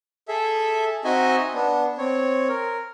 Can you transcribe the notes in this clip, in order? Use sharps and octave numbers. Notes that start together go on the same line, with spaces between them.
G#4 A4 E5
C4 D#4 F#4 D#5 E5 G#5
B3 D4
C4 C#5
A#4